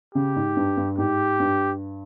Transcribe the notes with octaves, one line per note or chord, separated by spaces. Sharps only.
C#3 G4
G#2
G2
G2
G#2 G4
G2